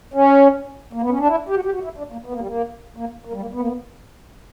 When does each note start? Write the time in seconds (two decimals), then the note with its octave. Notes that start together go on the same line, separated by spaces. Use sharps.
0.14 C#4
0.93 A#3
1.02 B3
1.10 C#4
1.19 D4
1.27 E4
1.49 G4
1.56 F#4
1.65 G4
1.74 F#4
1.84 E4
1.98 D4
2.12 A#3
2.26 B3
2.33 A#3
2.40 G3
2.47 A#3
2.97 A#3
3.25 A#3
3.33 G3
3.41 A#3
3.54 B3
3.61 A#3
3.68 B3